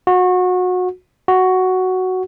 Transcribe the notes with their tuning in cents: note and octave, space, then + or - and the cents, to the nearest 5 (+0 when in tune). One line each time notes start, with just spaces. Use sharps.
F#4 -25
F#4 +5